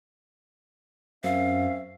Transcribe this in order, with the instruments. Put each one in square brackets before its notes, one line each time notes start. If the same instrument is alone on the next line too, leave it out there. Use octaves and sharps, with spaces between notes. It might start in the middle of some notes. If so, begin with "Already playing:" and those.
[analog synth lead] F#2 [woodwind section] C4 C#4 E5 [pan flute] F5